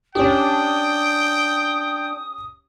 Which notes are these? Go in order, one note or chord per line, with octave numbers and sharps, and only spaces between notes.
C#4 D4 G4 G5 D#6